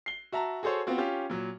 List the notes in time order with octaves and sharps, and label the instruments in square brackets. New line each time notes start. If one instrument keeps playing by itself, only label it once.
[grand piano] C7 G7
F#4 E5 A5 A#5
F#4 G#4 A4 C5 C#5
B3 C4 F4 F#4
C#4 F4 G4
A#2 F#3